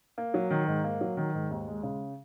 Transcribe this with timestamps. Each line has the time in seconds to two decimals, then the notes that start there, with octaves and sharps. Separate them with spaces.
0.18 A#3
0.34 F#3
0.51 D#3
0.67 G#2
0.84 A#3
1.01 F#3
1.17 D#3
1.34 G#2
1.51 D#2
1.67 G#3
1.83 C#3